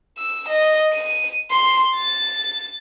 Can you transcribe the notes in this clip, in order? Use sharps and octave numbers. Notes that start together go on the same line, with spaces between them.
E6
D#5
D#7
C6
A6